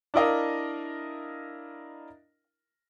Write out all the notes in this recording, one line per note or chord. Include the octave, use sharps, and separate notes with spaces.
D4 E4 A#4 D#5 F5